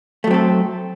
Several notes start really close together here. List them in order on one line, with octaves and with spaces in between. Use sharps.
A3 F#3 C4 A4